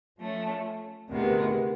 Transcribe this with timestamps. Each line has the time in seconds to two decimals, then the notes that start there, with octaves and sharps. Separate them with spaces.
0.19 F3 A3 C#4
1.09 D2 C3 D#3 G#3 B3